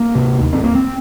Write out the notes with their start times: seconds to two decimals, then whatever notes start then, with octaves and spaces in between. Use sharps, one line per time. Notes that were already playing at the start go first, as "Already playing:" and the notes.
Already playing: A#3
0.15 C3
0.41 D#2
0.53 C4
0.64 A#3
0.75 C4